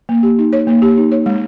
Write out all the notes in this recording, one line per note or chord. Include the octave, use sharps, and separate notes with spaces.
A#3
G4
D#4
C#5
A#3
G4
D#4
C#5
G#3